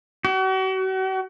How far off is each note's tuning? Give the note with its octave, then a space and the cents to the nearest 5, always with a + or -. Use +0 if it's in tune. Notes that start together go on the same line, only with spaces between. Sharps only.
F#4 +40